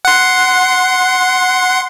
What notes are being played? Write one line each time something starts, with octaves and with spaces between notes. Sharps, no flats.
F#5 C6